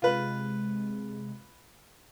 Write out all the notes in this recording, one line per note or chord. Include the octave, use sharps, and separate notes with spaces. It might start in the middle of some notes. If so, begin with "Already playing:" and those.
C3 G#3 F4 B4